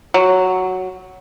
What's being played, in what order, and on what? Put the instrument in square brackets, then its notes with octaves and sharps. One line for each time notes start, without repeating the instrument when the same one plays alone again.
[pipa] F#3